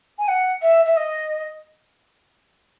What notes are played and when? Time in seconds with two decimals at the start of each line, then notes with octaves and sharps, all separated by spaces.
0.18 G#5
0.28 F#5
0.62 E5
0.85 E5
0.96 D#5